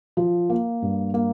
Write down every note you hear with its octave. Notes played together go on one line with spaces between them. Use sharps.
F3
A#3
G2
A#3